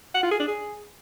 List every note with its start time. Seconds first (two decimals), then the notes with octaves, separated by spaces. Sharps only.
0.15 F#5
0.23 F4
0.31 G#4
0.40 D4
0.48 G#4